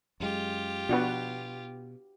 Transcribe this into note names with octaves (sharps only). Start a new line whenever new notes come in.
F#2 G#3 F4 G4
B2 F3 B3 D4 F#4 B4